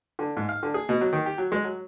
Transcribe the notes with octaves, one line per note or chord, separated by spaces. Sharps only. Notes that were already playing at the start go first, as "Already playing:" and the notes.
D3
G#2
F5
D3
G#4
B2
F#3
D#3
G4
F#3
G#3
F#3